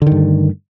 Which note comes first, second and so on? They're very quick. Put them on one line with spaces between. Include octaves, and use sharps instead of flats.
D3 D#3 G2 A3